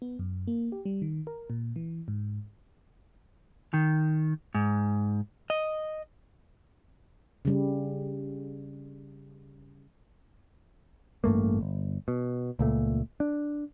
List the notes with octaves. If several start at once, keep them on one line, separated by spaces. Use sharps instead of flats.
B3
F#2
A#3
G4
G3
D#3
A#4
A#2
E3
G#2
D#3
G#2
D#5
C#3 G3
A1 G2 A3 A#3
G1
B2
C#2 A#2 A3
D4